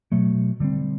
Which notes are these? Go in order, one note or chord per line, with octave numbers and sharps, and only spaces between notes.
B2 F#3 A3
D3 G3 C4